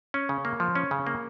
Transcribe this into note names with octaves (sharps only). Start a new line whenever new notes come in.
C#4
C#3
A#3
F3
C#4
C#3
A#3